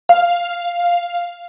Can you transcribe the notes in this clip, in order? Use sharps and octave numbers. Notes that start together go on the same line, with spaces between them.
F5